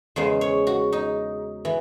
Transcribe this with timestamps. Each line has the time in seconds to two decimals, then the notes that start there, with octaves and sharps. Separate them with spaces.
0.16 E2 C#3 G#3 C5
0.41 C#5
0.67 F#4
0.92 D#4
1.65 E3